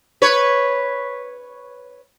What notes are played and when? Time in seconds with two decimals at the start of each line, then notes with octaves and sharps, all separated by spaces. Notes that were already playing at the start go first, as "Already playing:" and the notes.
0.22 B4 C#5